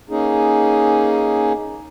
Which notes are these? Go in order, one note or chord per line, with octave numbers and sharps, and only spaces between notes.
A#3 C#4 D#4 G#4